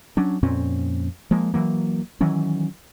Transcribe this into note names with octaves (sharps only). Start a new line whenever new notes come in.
F#3 C#4 D4
F2 A#2 C4 C#4
F3 G#3 A#3
E3 F#3 A#3
D#3 E3 F#3 C#4